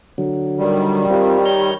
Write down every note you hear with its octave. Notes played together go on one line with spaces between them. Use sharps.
D3 F#3
D#3 G3
C4 F4 G4
C#5 A#5 G6